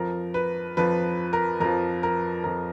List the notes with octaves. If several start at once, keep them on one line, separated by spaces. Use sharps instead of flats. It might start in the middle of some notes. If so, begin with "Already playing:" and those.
Already playing: F2 F3 A#4
B4
F2 F3 B4
A#4
F2 F3 A#4
A#4
F2 F3 A#4